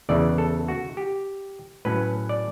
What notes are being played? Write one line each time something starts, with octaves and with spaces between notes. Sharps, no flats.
E2 C#3 E3 A3 D5
A4
F#4
G4
A2 F#3 C#4 B4
D5